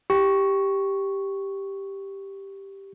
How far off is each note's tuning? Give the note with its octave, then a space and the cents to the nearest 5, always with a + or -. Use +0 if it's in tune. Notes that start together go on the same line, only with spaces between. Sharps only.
G4 +0 C#6 +0